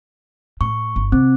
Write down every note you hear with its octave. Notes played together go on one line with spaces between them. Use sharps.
A2 C#6
G1
C3 C4